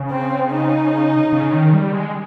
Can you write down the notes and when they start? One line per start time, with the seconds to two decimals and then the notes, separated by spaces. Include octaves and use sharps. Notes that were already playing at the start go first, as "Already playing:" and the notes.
Already playing: C#3
0.11 C4
0.51 D#4
1.32 C#3
1.53 D#3
1.74 G3
1.93 G#3